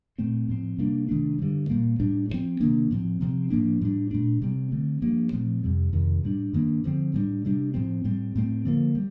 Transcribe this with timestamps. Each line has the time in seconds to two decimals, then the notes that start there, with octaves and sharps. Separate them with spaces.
0.18 A#2 A3 C4
0.49 A2 F3 C4
0.78 C3 G3 A#3 D4
1.09 C3 D#3 A3 D4
1.39 G2 D3 G3
1.70 A#2 G3 A#3
2.00 A2 G3 D4
2.29 G2 F3 C4
2.60 C3 D#3 A#3 D4
2.91 A2 F3 C4
3.21 C3 F3 C4
3.50 A2 F3 A#3 D4
3.81 A2 G3 D4
4.11 A#2 A3 D4
4.42 C3 G3 C4
4.72 D3 A3 C4
5.02 G2 F3 A#3
5.33 A#2 F3 A3 C4
5.63 F2 C3 G3
5.93 F2 C3 D#3
6.23 A2 G3 D4
6.53 G2 D#3 A#3 D4
6.84 D3 F3 C4
7.14 A2 G3 D4
7.45 C3 G3 D4
7.74 A2 F3 C4
8.05 A2 G3 C4
8.36 A2 A3 C4
8.65 D3 F3 A#3
8.95 G3